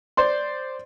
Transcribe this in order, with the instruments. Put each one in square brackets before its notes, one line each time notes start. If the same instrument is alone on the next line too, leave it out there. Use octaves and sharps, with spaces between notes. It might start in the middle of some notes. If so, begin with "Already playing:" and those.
[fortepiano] C5 D5 C6